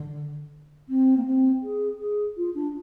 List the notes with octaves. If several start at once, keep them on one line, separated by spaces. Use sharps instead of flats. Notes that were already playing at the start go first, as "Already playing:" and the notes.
Already playing: D3
C4
A#3
C4
G#4
G#4
F4
D4